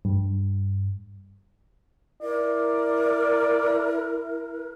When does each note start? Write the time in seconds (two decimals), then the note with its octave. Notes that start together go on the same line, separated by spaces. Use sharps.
0.05 G2
2.23 E4 A#4 D5